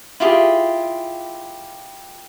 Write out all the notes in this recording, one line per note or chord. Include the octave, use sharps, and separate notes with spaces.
E4 F4 G4 G#4